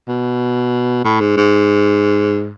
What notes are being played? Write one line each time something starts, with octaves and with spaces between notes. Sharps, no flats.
B2
A2
G#2
G#2